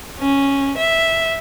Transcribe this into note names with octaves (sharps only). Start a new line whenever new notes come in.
C#4
E5